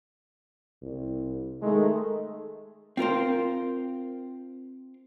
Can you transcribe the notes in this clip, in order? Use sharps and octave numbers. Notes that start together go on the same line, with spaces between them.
C2
D#3 G#3 A3
C4 F4 A#4 C5